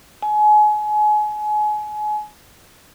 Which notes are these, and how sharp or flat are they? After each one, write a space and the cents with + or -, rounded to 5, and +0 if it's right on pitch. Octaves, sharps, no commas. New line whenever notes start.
G#5 +30